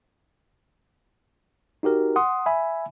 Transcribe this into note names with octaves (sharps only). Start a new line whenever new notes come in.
D#4 F#4 G4 A#4
F#5 C6 D#6
E5 G#5 B5